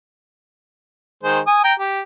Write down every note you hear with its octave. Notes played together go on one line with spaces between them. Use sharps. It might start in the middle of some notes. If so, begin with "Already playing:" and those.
D#3 G#3 C5
G#5 D#6
G5 A#5
G4